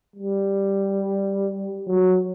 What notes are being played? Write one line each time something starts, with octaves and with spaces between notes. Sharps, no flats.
G3
F#3